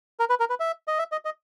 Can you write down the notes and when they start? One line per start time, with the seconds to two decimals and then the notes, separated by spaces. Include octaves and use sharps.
0.20 A#4
0.30 B4
0.40 A#4
0.50 B4
0.60 E5
0.88 D#5
0.99 E5
1.12 D#5
1.25 D#5